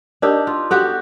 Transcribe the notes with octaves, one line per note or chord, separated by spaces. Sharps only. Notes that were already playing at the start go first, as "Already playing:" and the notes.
D4 D#4 G4 A#4 D5
F4
B3 F#4 G4 A4